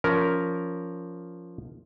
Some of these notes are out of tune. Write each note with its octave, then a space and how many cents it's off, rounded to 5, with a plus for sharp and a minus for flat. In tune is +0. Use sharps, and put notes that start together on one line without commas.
F3 +0 C#4 +15 A#4 +0